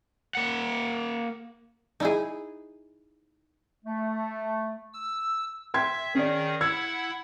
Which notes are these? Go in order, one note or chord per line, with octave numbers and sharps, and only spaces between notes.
A#3 F#5
D#4 E4 G#4
A3
E6
E5 G5 C6 G#6
D#3 C#4 G#4 D5
E4 F#5 E6 G#6